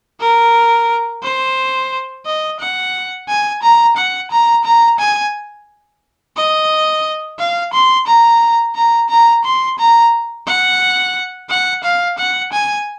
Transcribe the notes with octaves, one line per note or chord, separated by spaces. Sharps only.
A#4
C5
D#5
F#5
G#5
A#5
F#5
A#5
A#5
G#5
D#5
F5
C6
A#5
A#5
A#5
C6
A#5
F#5
F#5
F5
F#5
G#5